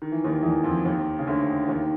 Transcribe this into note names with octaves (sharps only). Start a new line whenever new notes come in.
D#3
E3
D#2 D#3
E2 E3
F2 F3
D#2 D#3
C#3
D2 D3
D#2 D#3